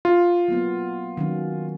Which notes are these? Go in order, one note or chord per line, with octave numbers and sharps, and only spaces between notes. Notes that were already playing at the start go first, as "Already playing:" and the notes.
F4
F#3 A#3 B3
D#3 F#3 C#4